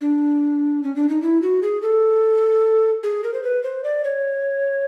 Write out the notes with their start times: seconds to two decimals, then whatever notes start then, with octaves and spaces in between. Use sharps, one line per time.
0.01 D4
0.83 C#4
0.96 D4
1.09 D#4
1.22 E4
1.42 F#4
1.62 G#4
1.82 A4
3.03 G#4
3.24 A#4
3.34 C5
3.44 B4
3.63 C5
3.84 D5
4.04 C#5